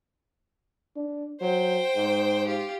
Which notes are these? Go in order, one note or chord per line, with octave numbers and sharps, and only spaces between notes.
D4
F#3 C5 G5
G#2
F4 G4